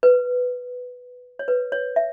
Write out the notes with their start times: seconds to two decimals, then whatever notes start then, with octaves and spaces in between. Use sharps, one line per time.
0.03 B4
1.39 C#5
1.48 B4
1.72 C#5
1.96 E5